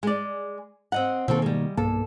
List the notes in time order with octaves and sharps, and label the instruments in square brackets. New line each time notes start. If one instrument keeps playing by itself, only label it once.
[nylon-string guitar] G#3 D5
C4 D#5 F#5
[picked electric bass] B2 D#3 A#3 [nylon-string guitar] C4 A4
[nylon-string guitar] G3 G#3
[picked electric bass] B1 G2 A#3 [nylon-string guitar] A4